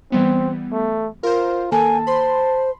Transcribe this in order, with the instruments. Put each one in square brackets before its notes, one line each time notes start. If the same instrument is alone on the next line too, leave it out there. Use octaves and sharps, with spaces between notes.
[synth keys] E3 G3 B3 [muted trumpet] C4
[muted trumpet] A3
[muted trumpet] F4 [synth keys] A#4 C5
[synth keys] D#3 A#3 A4 [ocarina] G#5 [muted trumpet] A5
[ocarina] C5 [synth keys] B5 C6